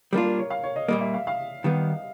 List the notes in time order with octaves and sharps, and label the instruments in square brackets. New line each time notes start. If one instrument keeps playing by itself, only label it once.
[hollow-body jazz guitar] G3 A#3 D4 F4 [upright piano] A#4
[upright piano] A#4
C#5
F5
C#5
D#5
[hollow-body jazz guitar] A#2 G3 A#3 [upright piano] D#5
[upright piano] E5
F5
F5
[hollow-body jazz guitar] D#3 G3 B3